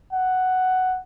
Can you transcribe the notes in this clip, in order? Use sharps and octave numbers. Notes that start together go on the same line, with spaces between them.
F#5